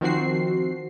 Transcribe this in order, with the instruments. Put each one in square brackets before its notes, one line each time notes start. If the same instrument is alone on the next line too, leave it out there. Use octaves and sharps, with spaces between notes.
[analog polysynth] D#3 F3 C4 F#4 C7